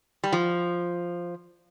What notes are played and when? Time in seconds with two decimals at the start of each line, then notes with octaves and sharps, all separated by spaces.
0.24 G3
0.32 F3